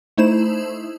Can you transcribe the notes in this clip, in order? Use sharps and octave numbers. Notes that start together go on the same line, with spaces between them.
A3 D#4 E4 C5 E7